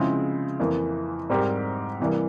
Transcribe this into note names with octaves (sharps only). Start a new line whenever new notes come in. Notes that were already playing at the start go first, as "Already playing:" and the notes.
Already playing: C#3 F3 G#3 C4 E4
F2 E3 A#3
G#2 G3 C4 G4 A#4
C3 E3 G3 A#3